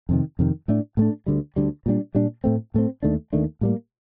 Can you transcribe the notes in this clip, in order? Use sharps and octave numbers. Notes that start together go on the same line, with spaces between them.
F2 C3 D#3
F2 C3 D#3
A2 A3 D4
A2 A3 D4
D2 D3 G3
D2 D3 G3
A#2 G3 D4
A#2 G3 D4
A2 A3 C4
A2 A3 C4
D#2 D#3 A3 D4
D#2 D#3 A3 D4
A2 G3 A#3